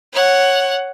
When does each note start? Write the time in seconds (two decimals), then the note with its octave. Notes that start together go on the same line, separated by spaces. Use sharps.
0.13 C#5 F#5